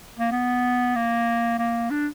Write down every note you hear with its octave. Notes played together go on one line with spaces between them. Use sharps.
A#3
B3
A#3
A#3
D4